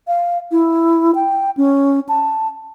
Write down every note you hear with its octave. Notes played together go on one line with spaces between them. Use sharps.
F5
E4
G5
C#4
A5